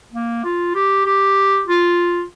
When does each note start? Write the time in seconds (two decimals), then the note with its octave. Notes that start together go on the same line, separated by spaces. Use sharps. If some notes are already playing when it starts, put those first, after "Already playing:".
0.13 A#3
0.44 F4
0.75 G4
1.06 G4
1.67 F4